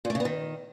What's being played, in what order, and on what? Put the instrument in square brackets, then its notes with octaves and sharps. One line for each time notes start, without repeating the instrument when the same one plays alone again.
[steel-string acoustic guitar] A#2
A3
C#3
B3
D#3